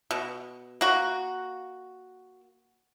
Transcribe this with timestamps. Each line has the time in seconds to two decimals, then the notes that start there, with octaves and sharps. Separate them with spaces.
0.11 B2
0.81 A#3 F#4